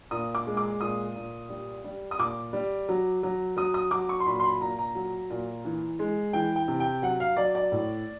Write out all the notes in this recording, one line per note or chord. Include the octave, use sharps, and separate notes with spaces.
A#2 D#6
D6
G#3
D6
A#2 D#6
A#2
G3
G3
D#6
A#2 D6
G3
F#3
F#3
F#3 D#6
D#6
F#3 D6
C#6
C6
A#2 B5
C6
B5
A#2 A#5
A#5
F#3
A#2
E3
G#3
E3 G5
G5
C3
G5
F#3 F#5
F5
F#3 D5
D5
A2